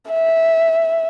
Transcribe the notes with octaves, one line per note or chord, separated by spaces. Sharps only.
E5